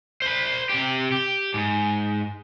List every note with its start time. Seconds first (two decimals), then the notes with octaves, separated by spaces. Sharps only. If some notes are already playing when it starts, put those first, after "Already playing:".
0.22 C5 B5
0.70 C3 G4
1.12 G4
1.54 G#2